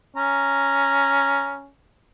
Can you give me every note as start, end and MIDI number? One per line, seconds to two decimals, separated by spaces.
0.16 1.70 61
0.16 1.58 82